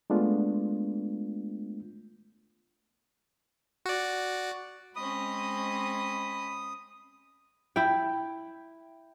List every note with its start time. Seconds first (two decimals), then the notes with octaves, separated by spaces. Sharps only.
0.10 G#3 A3 B3 D4 F4
3.86 F#4 D5
4.96 G#3 C4 C#4 D#5 B5 D#6
7.76 E4 E5 G5